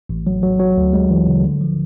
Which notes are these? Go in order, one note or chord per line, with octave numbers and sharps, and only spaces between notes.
A1
F#3
F#3
F#3
D2
G#3
E3
C#3
D3
F3